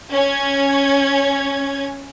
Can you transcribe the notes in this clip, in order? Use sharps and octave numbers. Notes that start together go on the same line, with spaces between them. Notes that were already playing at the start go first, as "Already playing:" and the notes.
C#4 G#6